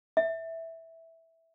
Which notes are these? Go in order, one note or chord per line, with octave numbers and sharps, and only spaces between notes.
E5